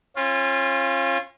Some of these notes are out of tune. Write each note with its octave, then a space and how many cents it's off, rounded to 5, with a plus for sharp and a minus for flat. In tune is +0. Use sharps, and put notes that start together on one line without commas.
C#4 -35 F4 -10